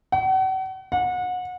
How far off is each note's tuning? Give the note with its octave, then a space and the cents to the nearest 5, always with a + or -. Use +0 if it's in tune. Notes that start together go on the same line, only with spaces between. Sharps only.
F#5 +40
F#5 -30